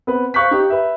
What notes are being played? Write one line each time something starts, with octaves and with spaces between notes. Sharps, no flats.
B3 C4 B4
C5 F5 C#6 F#6 G6 B6
D#4 G4
B4 E5